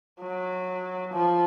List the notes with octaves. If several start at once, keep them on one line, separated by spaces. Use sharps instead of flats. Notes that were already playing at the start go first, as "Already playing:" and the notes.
F#3
F3